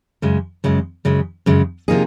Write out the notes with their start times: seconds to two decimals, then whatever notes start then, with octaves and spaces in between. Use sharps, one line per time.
0.22 F#2 C#3 G#3
0.64 F#2 C#3 G#3
1.05 F#2 C#3 G#3
1.46 F#2 C#3 G#3
1.88 C3 F3 A#3 D#4 G#4